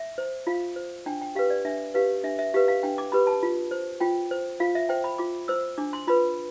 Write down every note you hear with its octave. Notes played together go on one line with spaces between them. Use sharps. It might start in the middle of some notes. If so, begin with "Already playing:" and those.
Already playing: E5
C5
F4 F5
C5
D4 G5
G5
G4 B4 F5
D5
D4 E5
G4 B4 F5
D4 E5
E5
G4 B4 F5
F5
D4 G5
D6
G4 B4 B5
A5
F4
C5
F4 G5
C5
F4 F5
E5
C5 G5
B5
F4 D6
C5 E6
D4 D6
C6
F4 B4 B5